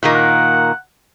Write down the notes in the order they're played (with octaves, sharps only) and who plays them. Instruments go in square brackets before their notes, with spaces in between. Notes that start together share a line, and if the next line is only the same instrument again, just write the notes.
[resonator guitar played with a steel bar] A#2 D#3 A#3
[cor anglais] F#5